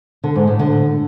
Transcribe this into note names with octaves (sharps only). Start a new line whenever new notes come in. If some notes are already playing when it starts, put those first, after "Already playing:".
D3
G#2
A2
D3